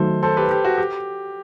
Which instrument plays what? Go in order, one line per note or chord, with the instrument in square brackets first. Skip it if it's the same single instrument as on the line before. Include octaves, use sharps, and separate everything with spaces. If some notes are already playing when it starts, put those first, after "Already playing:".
Already playing: [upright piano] D#3 F#3 A3 [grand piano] A4 C5
[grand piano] A4 C5
G4 B4
G4
F#4
G4